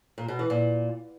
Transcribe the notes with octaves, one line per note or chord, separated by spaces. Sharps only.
A#2
B2
E3
A#2